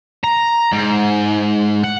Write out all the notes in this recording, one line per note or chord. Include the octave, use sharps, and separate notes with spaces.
A#5
G#2
F#5